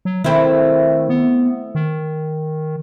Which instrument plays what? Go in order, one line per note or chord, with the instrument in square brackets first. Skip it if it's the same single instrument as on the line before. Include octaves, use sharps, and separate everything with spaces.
[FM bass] F#3
[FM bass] D#3 [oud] A3 C4 E4
[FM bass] B3
D#3